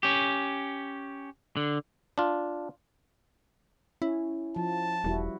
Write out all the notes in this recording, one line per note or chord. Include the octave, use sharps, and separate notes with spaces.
C#4 G4
D3
D4 F4
C#4 E4
F3 A5
E1 G3 E4 F#4